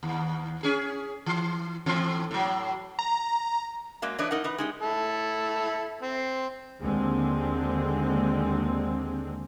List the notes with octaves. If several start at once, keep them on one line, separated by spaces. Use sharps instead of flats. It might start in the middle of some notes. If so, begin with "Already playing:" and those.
D#2
C#4 G#4
E3
A2 E3 C4
A2 F#3
A#5
F#3 G#3 A#3 F5
E3 A3 D4 B4 C#5 D#5
A2 D#4 A#4 F#5
E3 D#4 B4
G#3 D#4 G4
E4 A4
C4
D#2 D3 G#3 C4